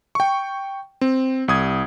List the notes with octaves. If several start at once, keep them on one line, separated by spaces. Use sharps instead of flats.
G5 C#6
C4
C2 D#6 G#6